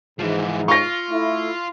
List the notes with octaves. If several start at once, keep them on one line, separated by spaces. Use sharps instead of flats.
G#2 E3 F3
F4 C#6 A#6
A3 E4